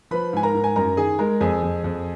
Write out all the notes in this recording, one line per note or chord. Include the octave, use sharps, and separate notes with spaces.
F3 B4 B5
G#2 G#5
A#4 A#5
G#2
G#5
F#2 A#4 A#5
D#3 G#4 G#5
G#3 A#4 A#5
F2 G#4 G#5
F2
F2